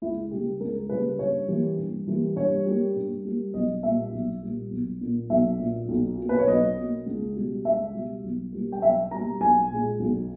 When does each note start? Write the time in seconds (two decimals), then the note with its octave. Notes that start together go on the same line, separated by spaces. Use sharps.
0.02 C#2 E4
0.31 C#3 G3 A#3 G4
0.60 C#2 A#4
0.89 C#3 G3 A#3 B4
1.19 G2 C#5
1.48 E3 G3 A#3
1.78 G2
2.07 E3 G3 A#3
2.36 G2 C#5
2.66 G3 A#3
2.96 G2
3.25 G3 A#3
3.54 B1 D#5
3.83 A#2 G3 A#3 E5
4.12 B1
4.42 A#2 G3 A#3
4.71 B1
5.01 A#2 A#3
5.30 B1 E5
5.59 A#2 A#3
5.89 B1
6.18 B2 A#3
6.29 B4
6.38 C#5
6.47 B1 D#5
6.77 B2 A#3
7.06 C#2
7.36 B2 G3
7.64 C#2 E5
7.94 B2 G3
8.24 B1
8.53 B2 G3 A#3
8.72 G5
8.82 B1 E5
9.11 B2 G3 A#3 A#5
9.41 B1 G#5
9.70 A#2 G#3
10.00 B1